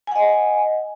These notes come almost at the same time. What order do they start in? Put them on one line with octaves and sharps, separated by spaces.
G#5 F#5 D#5